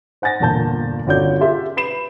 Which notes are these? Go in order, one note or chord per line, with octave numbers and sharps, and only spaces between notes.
C5 F#5 G#5 A6 A#6
G1 E2 A#2 A5 G6
G1 C#4 F#4 D5 G6
F4 G4 G#4 E5
B4 B5 C7 E7